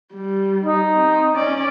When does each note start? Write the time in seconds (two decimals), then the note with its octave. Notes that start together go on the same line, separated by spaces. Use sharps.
0.14 G3
0.64 D#4
0.93 C4
1.33 C#4 D5